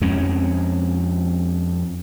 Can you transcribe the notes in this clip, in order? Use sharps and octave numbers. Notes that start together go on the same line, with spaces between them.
F2 G#3 C4 C#4